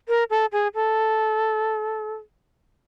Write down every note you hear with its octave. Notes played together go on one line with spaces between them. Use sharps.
A#4
A4
G#4
A4